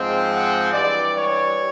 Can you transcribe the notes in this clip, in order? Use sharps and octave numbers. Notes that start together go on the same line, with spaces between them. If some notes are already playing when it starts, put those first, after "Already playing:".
Already playing: G#2 F3 G#3 C4
F#5
G2 E3 G3 D5
C#5